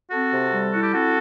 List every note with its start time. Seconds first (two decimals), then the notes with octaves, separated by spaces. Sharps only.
0.10 C4 F#4 A4
0.32 C3
0.51 G3
0.71 E4 F#4
0.82 G4
0.93 C4 F#4 A4